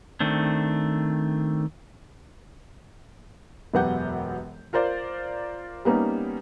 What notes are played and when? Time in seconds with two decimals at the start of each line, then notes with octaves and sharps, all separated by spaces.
0.20 D#3 A3 C4 D4
3.74 E1 F#2 B3 G4 F#5 G6
4.73 F4 A#4 C5 D5
5.85 G3 A#3 B3 C#4 D#4